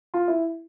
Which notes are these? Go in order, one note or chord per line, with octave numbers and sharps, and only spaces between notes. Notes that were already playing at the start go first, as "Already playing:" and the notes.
F4
E4